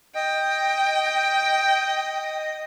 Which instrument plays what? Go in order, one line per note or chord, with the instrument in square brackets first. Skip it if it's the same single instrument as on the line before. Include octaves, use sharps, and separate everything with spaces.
[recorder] D#5 [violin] G5